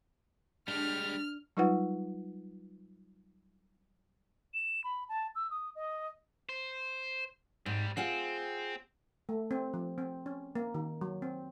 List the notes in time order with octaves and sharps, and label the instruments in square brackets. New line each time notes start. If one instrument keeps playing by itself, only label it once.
[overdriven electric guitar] G3 G#3 [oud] D4 [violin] F6
[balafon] F#3 G3 D#4 F4 B4 F#5
[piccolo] E7
B5
A5
E6
D#6
D#5
[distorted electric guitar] C5
[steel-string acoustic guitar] G#2 [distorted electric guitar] G3 C4
[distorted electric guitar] C4 [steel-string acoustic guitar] F4 G#4 F#5
[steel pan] A3
C4
F3
C4
C#4
A#3
D#3
F#3
C4